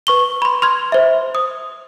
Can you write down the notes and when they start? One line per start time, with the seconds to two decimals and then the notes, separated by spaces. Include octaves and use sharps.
0.07 B4 C#6 G7
0.42 B5 C6
0.62 C6 F6 G#6
0.92 C5 E5
1.35 D#6